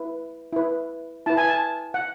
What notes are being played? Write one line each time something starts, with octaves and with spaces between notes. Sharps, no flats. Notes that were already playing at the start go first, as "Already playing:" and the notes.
Already playing: E4 B4
E4 B4
E4 B4 A5
G#5
A5
F#5